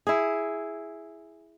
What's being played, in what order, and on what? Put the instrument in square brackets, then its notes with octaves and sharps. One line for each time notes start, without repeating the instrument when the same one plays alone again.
[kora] E4 G#4